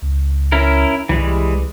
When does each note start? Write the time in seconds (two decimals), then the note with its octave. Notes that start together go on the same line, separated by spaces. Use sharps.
0.02 C#2
0.52 C#4 E4 A#4
1.09 C2 E3 G3 G#3